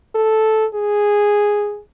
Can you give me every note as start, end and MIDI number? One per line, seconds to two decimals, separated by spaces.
0.15 0.66 69
0.74 1.80 68